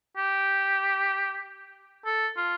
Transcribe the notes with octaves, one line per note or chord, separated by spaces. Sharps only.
G4
A4
F4